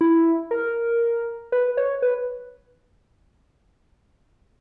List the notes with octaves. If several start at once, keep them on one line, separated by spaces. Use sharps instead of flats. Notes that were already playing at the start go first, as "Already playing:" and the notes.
E4
A#4
B4
C#5
B4